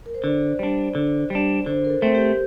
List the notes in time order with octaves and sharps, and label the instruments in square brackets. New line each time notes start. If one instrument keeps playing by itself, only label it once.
[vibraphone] A#4
C5
[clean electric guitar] D3 [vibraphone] D5
[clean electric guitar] G3 D4
D3
G3 D4
[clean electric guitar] D3 [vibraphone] C5
[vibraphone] A#4
A4
[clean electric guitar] A3 C4
[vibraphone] G4